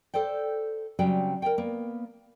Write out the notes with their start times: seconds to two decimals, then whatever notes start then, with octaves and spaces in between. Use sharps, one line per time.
0.14 A4 C5 D5 G5
0.99 C#3 F#3 G3 C4 D5 G5
1.42 A#4 C#5 D5 G5
1.58 A#3 B3